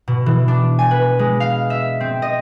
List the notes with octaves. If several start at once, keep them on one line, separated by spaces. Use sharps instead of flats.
B2
E3
D4
G#5
B4
G#3
F5
E5
C4
D#5